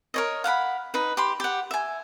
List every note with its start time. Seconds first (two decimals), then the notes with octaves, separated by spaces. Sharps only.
0.14 A#4 C#5 D#5
0.44 F5 F#5 A#5 B5
0.94 D#4 B4
1.17 G4 B5 C6
1.40 G4 F#5
1.71 E5 G#5